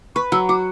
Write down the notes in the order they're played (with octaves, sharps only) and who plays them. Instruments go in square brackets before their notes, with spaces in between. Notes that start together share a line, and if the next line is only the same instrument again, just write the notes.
[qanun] B4 [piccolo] C#6
[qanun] F#3 [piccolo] E6
[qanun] F#4 [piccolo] D6